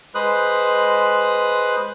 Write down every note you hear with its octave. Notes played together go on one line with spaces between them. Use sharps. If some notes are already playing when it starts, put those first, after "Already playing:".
G#3 B4 C5 D#6 F#6